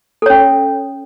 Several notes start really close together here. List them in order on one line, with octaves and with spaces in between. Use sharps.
A4 C#5 C#4